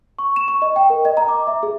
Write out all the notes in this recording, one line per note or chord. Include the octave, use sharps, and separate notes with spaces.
C#6
E7
C#6
D#5
G5
A#4
D#5
A#5
D6
E5
G#4